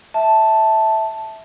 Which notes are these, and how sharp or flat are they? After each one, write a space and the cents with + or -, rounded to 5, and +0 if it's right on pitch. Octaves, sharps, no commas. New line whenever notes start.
E5 -15 A5 +0